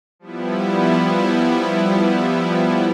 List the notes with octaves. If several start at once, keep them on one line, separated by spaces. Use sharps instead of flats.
F3 G3 B3 E4